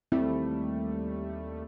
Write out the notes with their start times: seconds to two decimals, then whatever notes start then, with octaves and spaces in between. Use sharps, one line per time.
0.12 D#2 G3 A3 C4 E4